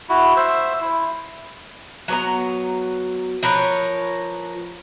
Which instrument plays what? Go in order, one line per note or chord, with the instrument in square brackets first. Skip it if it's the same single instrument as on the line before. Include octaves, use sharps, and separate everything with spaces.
[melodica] E4 F#4
C5 E5
E4
[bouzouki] F#3 B3 A#5
F3 A#4 B4 C#5